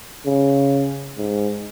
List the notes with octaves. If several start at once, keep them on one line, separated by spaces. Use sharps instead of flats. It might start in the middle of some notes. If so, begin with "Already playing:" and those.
C#3
G#2